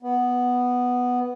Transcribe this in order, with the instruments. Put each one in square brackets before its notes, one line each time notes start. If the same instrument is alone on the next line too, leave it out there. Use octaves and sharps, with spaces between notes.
[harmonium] B3